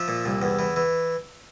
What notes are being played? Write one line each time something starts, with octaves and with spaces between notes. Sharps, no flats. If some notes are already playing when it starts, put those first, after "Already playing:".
Already playing: F3 E5
A#2
C2
E2
E3
E3